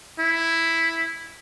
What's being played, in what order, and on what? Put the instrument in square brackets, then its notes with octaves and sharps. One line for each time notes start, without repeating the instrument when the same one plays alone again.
[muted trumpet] E4